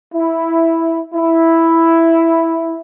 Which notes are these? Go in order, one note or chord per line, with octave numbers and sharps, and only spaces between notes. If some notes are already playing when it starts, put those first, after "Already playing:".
E4
E4